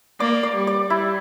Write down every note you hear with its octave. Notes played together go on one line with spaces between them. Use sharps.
A#3 D5
D5
G3
D5
G3 E4